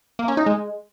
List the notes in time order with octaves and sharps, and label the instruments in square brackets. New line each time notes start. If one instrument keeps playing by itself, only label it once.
[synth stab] A#3
C#4
D#4
G#3